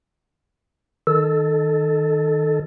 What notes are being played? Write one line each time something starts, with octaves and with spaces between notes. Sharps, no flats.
D#3 A4